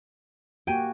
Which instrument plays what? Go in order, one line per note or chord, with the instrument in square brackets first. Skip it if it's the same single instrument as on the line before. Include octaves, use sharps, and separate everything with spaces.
[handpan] A#3 F#4 G4 [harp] G5 G#5